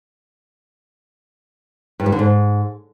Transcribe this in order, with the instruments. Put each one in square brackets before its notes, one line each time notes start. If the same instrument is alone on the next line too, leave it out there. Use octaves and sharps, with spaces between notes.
[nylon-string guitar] G2
G3
D3
G#2